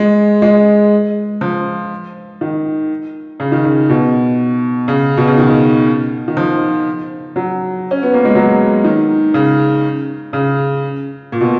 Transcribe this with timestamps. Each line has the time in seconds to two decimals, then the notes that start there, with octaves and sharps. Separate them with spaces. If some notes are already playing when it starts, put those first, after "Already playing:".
Already playing: G#3
0.42 G#3
1.41 F3
2.41 D#3
3.40 C#3
3.52 D#3
3.65 C#3
3.89 B2
4.88 C#3
5.17 B2
5.28 C#3
5.38 D#3
6.28 D#3
6.37 F3
7.36 F#3
7.91 C#4
8.03 B3
8.14 A#3
8.25 G#3
8.35 F#3
8.84 D#3
9.34 C#3
10.33 C#3
11.32 A#2
11.41 B2